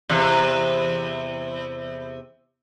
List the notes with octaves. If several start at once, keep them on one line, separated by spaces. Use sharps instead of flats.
E2 C3